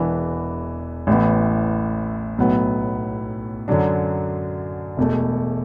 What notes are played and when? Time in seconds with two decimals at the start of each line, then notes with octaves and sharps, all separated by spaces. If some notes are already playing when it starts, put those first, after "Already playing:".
Already playing: E1 E2 E3 B3 D4
1.07 A1 A2 E3 B3
2.38 B1 A2 F#3 B3
3.68 F#2 D3 F#3 D4
4.97 E1 E2 B2 A3